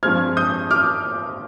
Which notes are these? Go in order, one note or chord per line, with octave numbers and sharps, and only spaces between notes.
G2 F3 G#3 C4 F6 G#6
D#6 G6
D6 F6